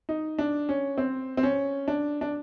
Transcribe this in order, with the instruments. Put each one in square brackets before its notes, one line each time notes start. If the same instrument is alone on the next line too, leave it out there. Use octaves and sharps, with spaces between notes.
[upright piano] D#4
D4
C#4
C4
C4
C#4
D4
D4